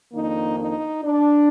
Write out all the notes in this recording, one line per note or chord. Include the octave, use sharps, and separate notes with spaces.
F2 D#3 A#3 D4 D#4
D#4
D4